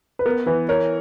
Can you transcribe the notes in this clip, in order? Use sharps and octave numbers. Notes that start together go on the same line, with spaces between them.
B4
B3 A#4
E3 B4
A#4 C#5